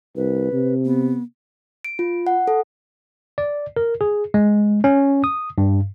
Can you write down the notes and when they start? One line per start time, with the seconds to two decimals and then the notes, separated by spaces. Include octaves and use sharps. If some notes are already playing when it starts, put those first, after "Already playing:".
0.16 C2 B4
0.52 C3
0.85 B3
1.85 D7
1.99 F4
2.27 F#5
2.47 A4
3.38 D5
3.77 A#4
4.01 G#4
4.34 G#3
4.84 C#4
5.24 D#6
5.58 G2